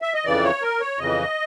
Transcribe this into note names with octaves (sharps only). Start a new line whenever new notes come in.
E5
D#5
F2 C#3 E3 D5
C#5
A#4
C#5
F2 C#3 E3 D#5